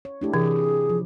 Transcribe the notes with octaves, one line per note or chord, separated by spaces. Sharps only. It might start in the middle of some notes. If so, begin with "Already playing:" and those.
C#5
A3 D4 E4 G4
C3 E3 G#4
F3